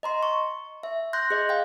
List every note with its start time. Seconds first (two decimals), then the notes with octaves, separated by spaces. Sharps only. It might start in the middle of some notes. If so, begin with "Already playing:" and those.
0.03 D#5 A#5 C6
0.23 C#6
0.83 E5
1.13 C6 F#6 G6 A#6
1.31 G#4 D#5
1.49 F5 G5